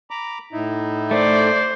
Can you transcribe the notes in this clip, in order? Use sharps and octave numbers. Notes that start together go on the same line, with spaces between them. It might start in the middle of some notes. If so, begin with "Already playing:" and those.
A#5 B5 D6
A2 D#4 E4
A3 C5 D5